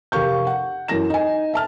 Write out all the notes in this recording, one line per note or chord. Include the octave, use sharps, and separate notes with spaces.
F1 G4 A#4 F5 C#6 G6
F#5
F#2 E3 A#6 E7
D#4 G#5
E5 A5 F6